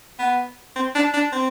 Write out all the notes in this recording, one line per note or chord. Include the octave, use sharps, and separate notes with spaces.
B3
C4
D4
D4
C4